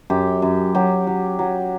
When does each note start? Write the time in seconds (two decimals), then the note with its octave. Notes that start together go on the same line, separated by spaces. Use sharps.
0.10 F#2 G4
0.42 F#2
0.75 F#3 G4
1.07 F#3
1.39 F#3